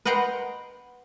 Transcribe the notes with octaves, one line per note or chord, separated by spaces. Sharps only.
B4 D#5 F#5 G5 A#5 C6